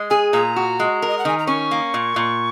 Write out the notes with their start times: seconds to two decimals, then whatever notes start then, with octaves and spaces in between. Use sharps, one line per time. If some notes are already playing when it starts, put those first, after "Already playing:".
Already playing: G#3
0.10 G#4 G#5
0.33 A#2 A#5
0.56 F#4
0.80 G#3
1.02 A#4
1.08 D#5
1.19 F#5
1.25 D#3 G#5
1.38 A#5
1.47 C#4 C#6
1.71 A#3
1.94 A#2
2.16 A#2